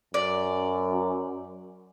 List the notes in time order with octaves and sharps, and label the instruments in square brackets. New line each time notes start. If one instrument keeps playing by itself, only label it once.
[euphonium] F#2 [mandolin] D5